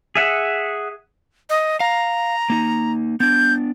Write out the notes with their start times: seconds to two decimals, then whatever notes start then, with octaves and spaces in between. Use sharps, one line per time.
0.15 G#4 E5 F#5
1.50 D#5
1.80 F5 A#5
2.50 A#3 D#4
3.20 B3 D4 G6